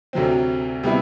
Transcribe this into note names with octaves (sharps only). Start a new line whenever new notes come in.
D2 C3 F#3 C4
C3 G3 B3 E4